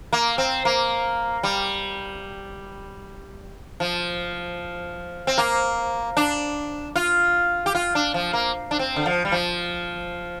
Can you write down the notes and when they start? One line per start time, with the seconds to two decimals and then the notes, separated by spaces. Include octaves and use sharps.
0.13 A#3
0.38 C4
0.65 A#3
1.43 G3
3.80 F3
5.27 C4
5.38 A#3
6.17 D4
6.96 F4
7.66 G4
7.75 F4
7.95 D4
8.14 F3
8.33 A#3
8.71 D4
8.79 C4
8.96 D3
9.06 F3
9.25 G3
9.32 F3